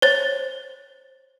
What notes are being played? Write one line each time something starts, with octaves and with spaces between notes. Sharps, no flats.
C5 C#5 A6